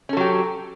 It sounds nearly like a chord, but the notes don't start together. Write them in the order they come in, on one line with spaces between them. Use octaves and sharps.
C#4 A4 F#3 G4